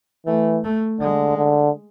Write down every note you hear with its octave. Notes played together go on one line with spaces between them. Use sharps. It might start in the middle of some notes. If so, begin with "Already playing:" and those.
E3 A3
A3
D3 G#3
D3